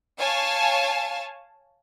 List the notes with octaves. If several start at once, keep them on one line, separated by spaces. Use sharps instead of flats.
C#5 F5 G#5 A5